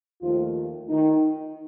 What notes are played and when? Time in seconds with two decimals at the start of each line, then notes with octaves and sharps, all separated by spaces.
0.21 D#2 D#3 F3 A3 F4
0.89 D#3 D#4